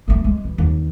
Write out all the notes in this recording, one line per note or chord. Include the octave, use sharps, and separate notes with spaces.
A3 A#3
G#3
E3
D#2